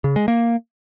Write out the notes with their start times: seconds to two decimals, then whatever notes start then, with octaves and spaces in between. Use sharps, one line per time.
0.04 C#3
0.16 G#3
0.28 A#3